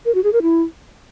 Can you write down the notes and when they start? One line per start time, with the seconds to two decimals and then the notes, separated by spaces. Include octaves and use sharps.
0.05 A#4
0.15 F#4
0.24 G#4
0.33 A#4
0.42 E4